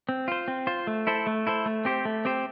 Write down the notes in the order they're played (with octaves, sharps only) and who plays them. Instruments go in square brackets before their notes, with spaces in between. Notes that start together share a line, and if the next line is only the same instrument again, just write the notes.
[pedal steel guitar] C4
F4 C5
C4
F4 C5
A3
E4 A4 C5
A3
E4 A4 C5
A3
C4 G4 C5
A3
C4 G4 C5